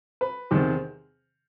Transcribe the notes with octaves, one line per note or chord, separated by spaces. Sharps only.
B4
E2 C3 D#3 C5